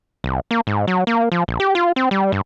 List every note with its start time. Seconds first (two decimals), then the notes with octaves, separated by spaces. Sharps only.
0.24 C2
0.51 A#3
0.67 G#2
0.87 F#3
1.07 A#3
1.32 F3
1.48 A#1
1.60 G4
1.75 F4
1.96 C4
2.11 G3
2.32 G2